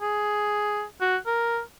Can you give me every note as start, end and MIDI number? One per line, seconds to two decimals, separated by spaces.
0.02 0.84 68
1.01 1.17 66
1.27 1.60 70